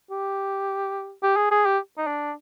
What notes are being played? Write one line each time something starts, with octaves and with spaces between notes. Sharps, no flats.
G4
G4
G#4
G#4
G4
D#4
D4